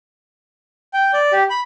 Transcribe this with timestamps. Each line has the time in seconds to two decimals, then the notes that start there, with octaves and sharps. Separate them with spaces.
0.93 G5
1.13 D5
1.32 G4
1.50 B5